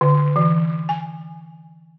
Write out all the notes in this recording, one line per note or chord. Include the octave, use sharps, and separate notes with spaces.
D3
E3
G#5